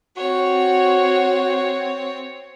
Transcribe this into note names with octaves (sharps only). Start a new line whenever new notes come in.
C4 F#4 C#5